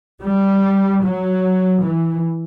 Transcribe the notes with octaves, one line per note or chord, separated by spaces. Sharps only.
G3
F#3
E3